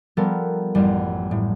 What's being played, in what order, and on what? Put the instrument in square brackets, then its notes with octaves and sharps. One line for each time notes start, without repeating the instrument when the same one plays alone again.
[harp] F3 G3 B3 A4 A#4
A1 F#2 G3
A2